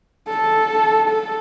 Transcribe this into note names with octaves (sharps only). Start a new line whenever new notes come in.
A4
A4